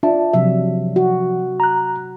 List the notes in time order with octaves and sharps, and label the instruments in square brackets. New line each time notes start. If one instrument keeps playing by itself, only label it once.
[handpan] D4 [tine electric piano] F4 E5 A5
[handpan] C3 F#3 E5 [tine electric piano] F3
[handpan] F#4
[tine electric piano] A#5 F#6